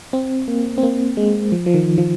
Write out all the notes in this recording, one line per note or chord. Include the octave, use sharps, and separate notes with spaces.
C4
A#3
C4
A#3
G#3
F3
F3
D#3
F3